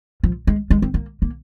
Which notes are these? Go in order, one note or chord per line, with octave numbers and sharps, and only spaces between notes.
F3
G#3
G#3
C4
A#3
A#3